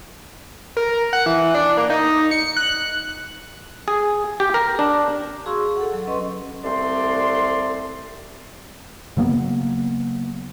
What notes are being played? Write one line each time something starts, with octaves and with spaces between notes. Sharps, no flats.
A#4
F#5
E3
D4
A#3
D#4
C#7
F#6
G#4
G4
A#4
D4
F#4 G#4 F5 C6 C#6 E6
G#4
A4 F#5
F#3
C#4 B4 D#5 C6
C2 A3 C4 D5 C6
C#3 F#3 A#3 B3